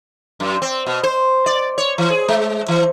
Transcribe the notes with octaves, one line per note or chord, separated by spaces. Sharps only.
F#2
C4
B2
C5
D5
C#5
E3
G#4
G#3
E3